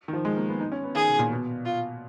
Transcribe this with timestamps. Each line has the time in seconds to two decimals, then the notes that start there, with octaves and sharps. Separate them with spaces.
0.08 D#3
0.13 F3
0.25 G#3
0.37 A#3
0.49 B3
0.60 D#4
0.72 C#4
0.84 B3
0.95 D#3 G#4
1.08 B2
1.19 A#2
1.31 B2
1.65 F4